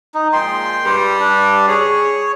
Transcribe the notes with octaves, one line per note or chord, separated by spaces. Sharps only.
D#4
A#2 F3 G#3 G5 C6
G2 G3
D4
G#4 C#5